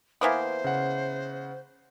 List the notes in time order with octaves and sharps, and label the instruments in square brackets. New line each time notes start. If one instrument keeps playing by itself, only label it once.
[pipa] E3 A#3 B3 [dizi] C5
[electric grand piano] C#3 F#5